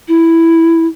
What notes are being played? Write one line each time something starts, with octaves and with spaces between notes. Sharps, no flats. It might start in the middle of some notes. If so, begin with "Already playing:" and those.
E4